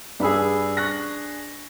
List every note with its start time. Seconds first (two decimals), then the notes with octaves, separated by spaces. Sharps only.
0.20 G2 D4 G#4 B5 E6
0.77 C#6 F#6 A#6